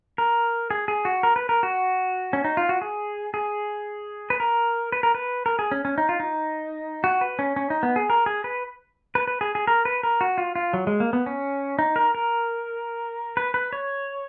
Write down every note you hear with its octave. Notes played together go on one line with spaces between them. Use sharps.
A#4
G#4
G#4
F#4
A#4
B4
A#4
F#4
C#4
D#4
F4
F#4
G#4
G#4
B4
A#4
B4
A#4
B4
A#4
G#4
C#4
C#4
D#4
F4
D#4
F#4
B4
C#4
C#4
D#4
B3
G#4
A#4
G#4
B4
B4
B4
G#4
G#4
A#4
B4
A#4
F#4
F4
F4
F#3
G#3
A#3
B3
C#4
D#4
A#4
A#4
B4
B4
C#5